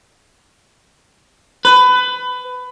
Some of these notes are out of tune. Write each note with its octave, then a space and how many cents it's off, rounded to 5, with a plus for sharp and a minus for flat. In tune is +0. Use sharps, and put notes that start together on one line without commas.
B4 +20